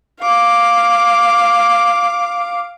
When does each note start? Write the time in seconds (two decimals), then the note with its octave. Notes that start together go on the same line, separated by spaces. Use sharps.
0.20 F5 D6